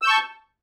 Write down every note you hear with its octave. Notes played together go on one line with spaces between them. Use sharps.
A5 C#6 E6 G6